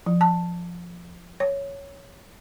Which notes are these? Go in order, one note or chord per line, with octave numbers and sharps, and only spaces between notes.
F3
A5
C#5